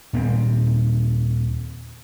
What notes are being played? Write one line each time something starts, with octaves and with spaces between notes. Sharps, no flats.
D#2 A#2 G#3 C4